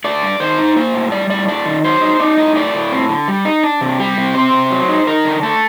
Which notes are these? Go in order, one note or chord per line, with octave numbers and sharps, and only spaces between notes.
A3 D5
G2
D#3 C5
D#4
A#3 C5
A2
G3 D5
A2 D5
A3 D5
D#3
F#3 C5
D#4
D#4 D5
A2 D#5
A3 D5
A2
C4
D3
G3
D#4
D4
C3
G3 G4
C3
C4 C5
C3
F#3
D#4
D#4 A#4
D3
A3 A4